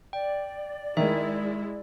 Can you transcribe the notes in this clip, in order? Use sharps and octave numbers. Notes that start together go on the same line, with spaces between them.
D5 G5
D#3 G#3 E4 E5